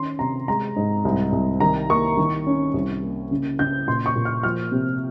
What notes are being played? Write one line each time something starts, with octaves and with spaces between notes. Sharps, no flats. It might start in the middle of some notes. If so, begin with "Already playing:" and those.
Already playing: D#3 C#4 C6
C3 A#5
G#3 A#5
G#2
C2
C2
D#3 A#5
A#3 C#6
D#3
C#4
C2
A#3
C#3
C#3 G6
A#2 C6
C#6
A#2
F6
F3 F6
C3